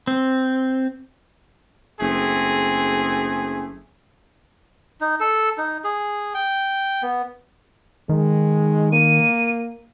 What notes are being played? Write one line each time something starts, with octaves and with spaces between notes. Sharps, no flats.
C4
F#1 A3 C4 G#4
D#4
A4
D#4
G#4
G5
B3
D#3 G#3
A#3 D#7